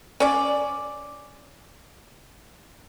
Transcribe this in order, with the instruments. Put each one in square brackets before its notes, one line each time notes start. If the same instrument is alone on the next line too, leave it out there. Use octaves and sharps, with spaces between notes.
[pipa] C#4 D5